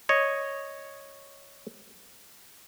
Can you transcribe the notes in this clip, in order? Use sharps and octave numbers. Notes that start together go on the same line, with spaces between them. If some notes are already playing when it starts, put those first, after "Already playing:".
C#5 D#5